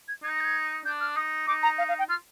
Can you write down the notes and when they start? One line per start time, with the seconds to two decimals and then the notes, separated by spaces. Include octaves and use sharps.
0.08 G#6
0.23 D#4 G#6
0.34 A#6
0.41 G6
0.44 G#6
0.85 D4 G6
1.01 F6
1.16 D#4 D#6
1.47 D#4 D6
1.63 A#5
1.78 F5
1.89 F5
1.99 G5
2.09 F4 F6